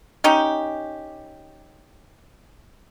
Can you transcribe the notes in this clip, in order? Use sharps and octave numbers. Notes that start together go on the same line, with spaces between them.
C#4 D#4 G4